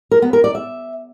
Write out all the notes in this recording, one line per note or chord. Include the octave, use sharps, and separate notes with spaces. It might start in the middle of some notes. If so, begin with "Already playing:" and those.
A#4
B3
A#4
D5
E5